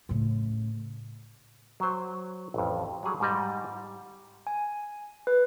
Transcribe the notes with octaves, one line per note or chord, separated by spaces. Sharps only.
A2 C#3
F#3 C5
A1 F2
F#3 G3 G#4
G#2 G3 D#5
G#5
B4